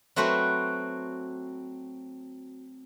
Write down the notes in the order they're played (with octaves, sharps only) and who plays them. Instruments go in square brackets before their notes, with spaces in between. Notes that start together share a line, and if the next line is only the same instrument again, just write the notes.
[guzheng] F#3 A3 C4 F#4 B4 C5